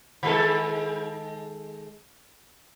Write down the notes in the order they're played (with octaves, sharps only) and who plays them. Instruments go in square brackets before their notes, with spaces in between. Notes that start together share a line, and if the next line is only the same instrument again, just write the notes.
[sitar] D#3 G#3 A4